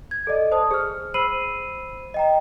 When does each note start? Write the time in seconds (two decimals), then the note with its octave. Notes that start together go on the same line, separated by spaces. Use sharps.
0.11 G#6
0.27 A4 D5 D#5
0.52 C5 A5 D#6
0.71 G#4 F6
1.14 C5 B5 E6 C7 D#7 F#7
2.14 D#5 G5 A#5